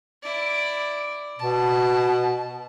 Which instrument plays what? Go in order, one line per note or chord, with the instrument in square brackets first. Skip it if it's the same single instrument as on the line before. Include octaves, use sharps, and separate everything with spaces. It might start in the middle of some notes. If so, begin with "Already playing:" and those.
[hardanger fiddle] E4 D5
[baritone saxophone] B2 [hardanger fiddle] A5